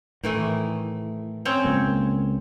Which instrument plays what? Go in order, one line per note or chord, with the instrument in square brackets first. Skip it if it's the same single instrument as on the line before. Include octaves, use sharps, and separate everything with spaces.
[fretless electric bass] A2 [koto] D#3 E3 A3
[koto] C4 C#4 C#5
[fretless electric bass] C#2 A#3